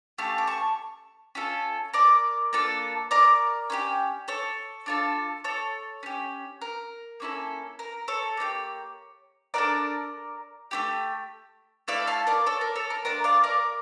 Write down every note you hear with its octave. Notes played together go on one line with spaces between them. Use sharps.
A3 C#4 G4 F5 A5
D6
A5 C#6
C#4 F4 A4
A#4 D5
A#3 D4 F4 A4
A#4 D5
C#4 E4 G4
A4 C#5
D4 F4 A4
A4 C#5
C#4 G4
A#4
A#3 C#4 E4 A4
A#4
A4 C#5
A#3 D4 G4
D4 F4 A4 A#4 D5
A3 C#4 G4
A3 E4 A4 D5 F5
F5 A5
A#4 D5
A4 C#5
A#4
A4 C#5
A#4
A3 D4 F4 A#4 D5
D5 F5
A#4 D5